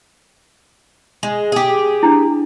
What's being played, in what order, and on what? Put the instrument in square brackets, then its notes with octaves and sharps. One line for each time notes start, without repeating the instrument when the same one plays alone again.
[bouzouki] G#3
G4 G#4
[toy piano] D4 E4